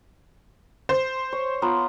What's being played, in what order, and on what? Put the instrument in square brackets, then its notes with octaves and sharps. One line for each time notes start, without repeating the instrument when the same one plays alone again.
[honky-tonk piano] C5
[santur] C#5
B3 F4 A#5